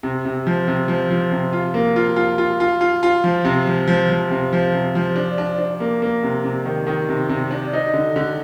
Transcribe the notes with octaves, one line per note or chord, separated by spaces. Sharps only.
C3
C3
F3
C3
F3
F3
C3
F4
A#3
F4
F4
F4
F4
F4
F4
F3
C3
F3
F3
F3
C3
F3
C3
F3
D4
D4
D4
A#3
A#3
C3
C3
D#3
D#3
C3
C3
D4
D#4
D3
D3